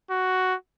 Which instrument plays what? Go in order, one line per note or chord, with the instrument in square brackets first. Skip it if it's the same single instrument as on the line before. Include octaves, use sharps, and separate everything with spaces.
[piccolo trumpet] F#4